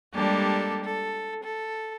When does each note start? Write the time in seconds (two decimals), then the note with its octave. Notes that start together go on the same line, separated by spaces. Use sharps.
0.15 G3 G#3 A#3 D4 G4 A4
0.85 A4
1.44 A4